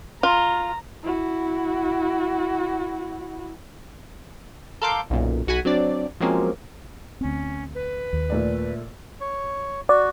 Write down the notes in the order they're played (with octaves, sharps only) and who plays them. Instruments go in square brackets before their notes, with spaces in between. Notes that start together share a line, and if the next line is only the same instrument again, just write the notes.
[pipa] F4 [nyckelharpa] A#5
[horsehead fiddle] E4 F#4
[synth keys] A4 A#4 F5 C6 D6 G6
B1 F#2 A#2
B1 F#4 F#5 G#5 B5
F#3 C4 D4 D5
F3 F#3 G#3 A#3 C4 C#4
[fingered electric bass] D2 C4 [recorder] C#4
[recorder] B4
[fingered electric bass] D#2
[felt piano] A#2 A3 D5
[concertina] C#5
[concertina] F#4 [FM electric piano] D5